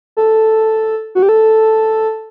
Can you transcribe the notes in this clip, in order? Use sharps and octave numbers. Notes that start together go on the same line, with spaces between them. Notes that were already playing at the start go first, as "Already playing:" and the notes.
A4
F#4
G4
A4